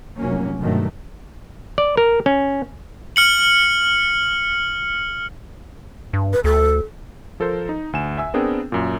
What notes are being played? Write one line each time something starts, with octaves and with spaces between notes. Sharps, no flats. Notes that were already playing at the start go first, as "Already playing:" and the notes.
F1 C3 F#3 A#3 C#4
G2 B2 D#3 F#3 A3
D5
A#4
C#4
F6 C#7 F#7
G2
B4
D2 A4
F3 A4 A#4 C5
D#4
D2 G#5 E7
E5 G#5 E6
B3 C4 D4 G#4 A#4 G5
F#2 A#2